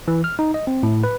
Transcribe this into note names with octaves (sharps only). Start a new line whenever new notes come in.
E3
F6
D#4
D#5
C4
A2
B4